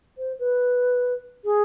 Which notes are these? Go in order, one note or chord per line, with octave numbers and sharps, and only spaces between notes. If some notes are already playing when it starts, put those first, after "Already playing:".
C5
B4
G#4